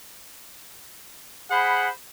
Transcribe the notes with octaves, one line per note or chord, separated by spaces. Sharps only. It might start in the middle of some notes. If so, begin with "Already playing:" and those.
G#4 C5 F#5 B5